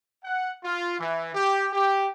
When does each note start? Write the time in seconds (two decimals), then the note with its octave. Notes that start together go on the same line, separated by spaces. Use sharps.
0.24 F#5
0.64 F4
1.00 E3
1.35 G4
1.73 G4